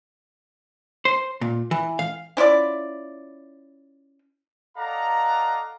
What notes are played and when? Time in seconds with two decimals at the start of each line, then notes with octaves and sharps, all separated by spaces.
1.05 C5
1.41 A#2
1.71 E3
1.99 F5
2.37 C#4 E4 F4 D5
4.78 A4 D5 D#5 F5 F#5 A#5